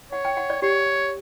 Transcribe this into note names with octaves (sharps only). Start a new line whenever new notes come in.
C#5 F#5
G5
F#5
D5
G4 C#5